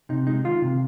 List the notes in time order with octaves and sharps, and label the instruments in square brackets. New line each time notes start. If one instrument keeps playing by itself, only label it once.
[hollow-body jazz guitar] C3 D#4
G#3 D#4
D#3 F4
C3